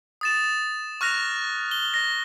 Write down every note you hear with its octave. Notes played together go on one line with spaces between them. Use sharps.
D#6 A6 E7
C#6 F6 F#6 A#6 F7
G7
A#6